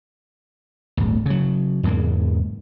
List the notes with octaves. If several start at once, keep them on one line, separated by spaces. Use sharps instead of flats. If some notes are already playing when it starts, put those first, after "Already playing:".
D1 G1 D2
C#3 F#3
E2 G#2 C#3 A#3